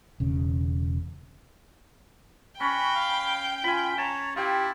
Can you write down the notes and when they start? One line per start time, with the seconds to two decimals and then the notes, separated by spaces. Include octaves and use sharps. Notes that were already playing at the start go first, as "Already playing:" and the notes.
0.20 E1 C#3
2.60 C#4 F#4 G5 B5
2.95 F5
3.64 F4 G#5 B5
3.98 C#5 A5 A#5
4.36 E4 F4 G4 G5